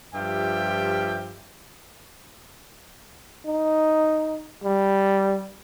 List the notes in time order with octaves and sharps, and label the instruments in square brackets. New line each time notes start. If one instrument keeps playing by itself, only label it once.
[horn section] G2 F3 F4 G4 E5 G5
[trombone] D#4
G3